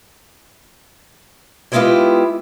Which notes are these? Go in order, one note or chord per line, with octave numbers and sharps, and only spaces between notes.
G3 G#3 B3 E4 F4 G4